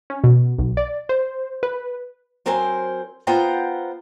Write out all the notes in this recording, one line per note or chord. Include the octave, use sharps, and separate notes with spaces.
C#4
B2
B1
D5
C5
B4
F#3 C4 A#4 C5 G#5
B3 F4 C5 F#5 G5 A#5